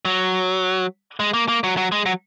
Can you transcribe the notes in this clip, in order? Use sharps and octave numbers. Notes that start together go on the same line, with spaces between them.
F#3
G#3
A#3
A#3
F#3
F#3
G#3
F#3